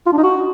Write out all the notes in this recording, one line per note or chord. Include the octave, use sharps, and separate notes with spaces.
F4
D4
D#4
F#4